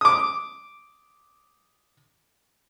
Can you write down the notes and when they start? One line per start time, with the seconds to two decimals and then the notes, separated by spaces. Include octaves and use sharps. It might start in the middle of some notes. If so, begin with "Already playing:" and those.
0.01 D6 D#6